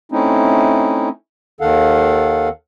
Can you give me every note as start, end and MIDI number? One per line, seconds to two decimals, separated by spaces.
0.12 1.09 57
0.12 1.09 60
0.12 1.09 61
0.12 1.09 63
0.12 1.09 64
1.61 2.49 39
1.61 2.49 51
1.61 2.49 69
1.61 2.49 77
1.61 2.49 78